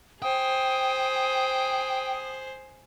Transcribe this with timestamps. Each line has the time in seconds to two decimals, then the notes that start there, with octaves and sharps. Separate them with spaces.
0.22 G#4 C5 G5 D#6